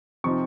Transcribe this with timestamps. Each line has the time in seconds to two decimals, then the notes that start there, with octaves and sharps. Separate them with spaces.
0.24 C3 F3 C4 D#4 C#6